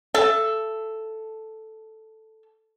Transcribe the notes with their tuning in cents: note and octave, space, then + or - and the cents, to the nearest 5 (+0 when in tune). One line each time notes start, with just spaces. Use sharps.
A4 +0 E5 +35